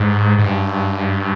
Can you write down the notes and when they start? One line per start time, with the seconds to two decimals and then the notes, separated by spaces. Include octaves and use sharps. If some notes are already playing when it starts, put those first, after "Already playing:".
Already playing: G#2
0.38 G#2
0.44 G2